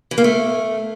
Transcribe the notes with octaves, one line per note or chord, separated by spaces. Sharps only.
E3
A#3
A3